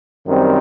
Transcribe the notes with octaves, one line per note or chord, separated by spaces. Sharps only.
F#2 D#3 G3 C4